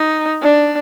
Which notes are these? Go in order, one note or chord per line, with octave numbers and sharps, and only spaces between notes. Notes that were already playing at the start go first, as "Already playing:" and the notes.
Already playing: D#4
D4